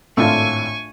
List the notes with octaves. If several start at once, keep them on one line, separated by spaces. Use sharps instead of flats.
G#1 A2 A3 D4 F4 G#5 C#6 E6